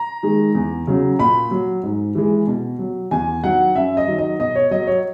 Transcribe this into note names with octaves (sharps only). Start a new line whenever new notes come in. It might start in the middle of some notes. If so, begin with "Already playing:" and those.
Already playing: A#5
D#3 G#3
E2
C#3 F#3
A#2 B5
F#3
G#2
E3 G#3
B2
F#3
E2 G#5
D#3 F#3 F#5
F#2 E5
D#5
D#3 F#3
D#5
B2 D#5
C#5
F#3 D#5
C#5